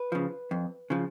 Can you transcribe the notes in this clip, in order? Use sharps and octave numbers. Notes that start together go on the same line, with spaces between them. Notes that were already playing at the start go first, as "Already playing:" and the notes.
Already playing: B4
C#3 F3
F2
C#3 F3